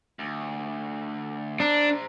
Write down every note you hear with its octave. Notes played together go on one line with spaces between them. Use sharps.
D2
D4 C5 A#5